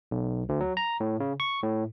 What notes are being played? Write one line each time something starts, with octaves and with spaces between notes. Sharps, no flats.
B1
D2
F#3
A#5
A2
C#3
C#6
A2